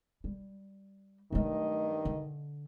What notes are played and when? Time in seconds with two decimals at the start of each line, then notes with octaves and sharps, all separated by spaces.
0.24 G3
1.32 G2 D#3 F#3 A3 D#5
2.05 D3